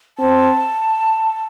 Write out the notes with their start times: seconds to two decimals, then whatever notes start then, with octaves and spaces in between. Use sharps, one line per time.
0.18 C4 A5